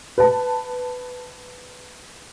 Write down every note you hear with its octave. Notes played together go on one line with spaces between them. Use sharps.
B4 A5